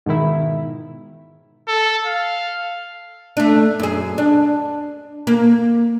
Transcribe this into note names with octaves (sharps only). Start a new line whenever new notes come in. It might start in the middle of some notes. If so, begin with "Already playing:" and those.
G#2 B2 D#3 E4
A4
F5
A3 D4
F#2 G#4
D4
A#3